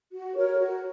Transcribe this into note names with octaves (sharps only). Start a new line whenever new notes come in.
F#4
A#4 C#5
F#4